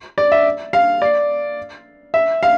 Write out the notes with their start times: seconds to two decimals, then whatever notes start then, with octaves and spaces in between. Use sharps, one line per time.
0.18 D5
0.32 E5
0.73 F5
1.02 D5
2.14 E5
2.43 F5